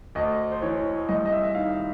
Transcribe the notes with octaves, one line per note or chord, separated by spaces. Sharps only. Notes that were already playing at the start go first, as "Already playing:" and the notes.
D2 D#5
C5
E3 C#5
C2 D#5
D#5
E5
E5
D#3 F5